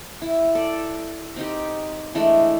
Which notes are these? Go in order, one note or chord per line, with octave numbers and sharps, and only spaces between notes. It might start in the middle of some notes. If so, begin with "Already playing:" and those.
E4
A4 D5
C4 D#4 G4
E3 G#3 A3 D4